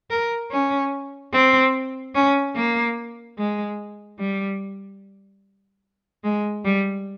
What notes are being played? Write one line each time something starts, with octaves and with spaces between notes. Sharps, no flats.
A#4
C#4
C4
C#4
A#3
G#3
G3
G#3
G3